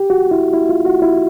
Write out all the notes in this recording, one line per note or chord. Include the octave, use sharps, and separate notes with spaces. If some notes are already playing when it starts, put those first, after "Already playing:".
Already playing: G4
F#4
E4
E4
F4
F#4
E4